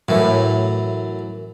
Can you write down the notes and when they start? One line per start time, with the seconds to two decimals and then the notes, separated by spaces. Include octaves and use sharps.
0.08 F#2 A2 E3